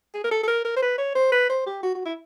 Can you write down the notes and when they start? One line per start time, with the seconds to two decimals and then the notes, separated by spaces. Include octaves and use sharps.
0.14 G#4
0.24 A#4
0.31 A4
0.43 A4
0.48 A#4
0.65 A#4
0.77 C5
0.83 B4
0.98 C#5
1.15 C5
1.32 B4
1.50 C5
1.67 G4
1.83 F#4
1.95 F#4
2.05 E4